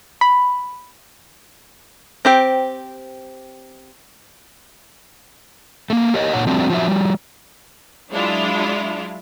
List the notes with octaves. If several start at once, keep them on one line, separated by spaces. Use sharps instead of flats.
B5
C4 G4 C5
A3 A#3
G4 A#4 C#5 D#5
A#2 C#5 F#5
F3 G3 A3 C4 D4 F#4
F3 F#3 F#4 E5
F3 G3
F#3 G#3 D4 E4 F4